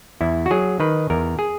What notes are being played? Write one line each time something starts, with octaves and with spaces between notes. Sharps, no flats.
E2 E4
F#4
F#3 G#4
D#3 B4
E2 A#4
G#4